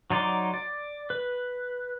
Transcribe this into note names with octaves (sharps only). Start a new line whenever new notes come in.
F#3 D#4 D5 C6 D6
D5
B4